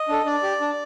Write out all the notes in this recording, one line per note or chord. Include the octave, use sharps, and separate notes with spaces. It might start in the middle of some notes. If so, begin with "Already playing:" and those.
Already playing: D#5
D4 A4
D4 D5
G4
D4